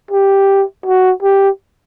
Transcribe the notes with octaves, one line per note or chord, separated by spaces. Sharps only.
G4
F#4
G4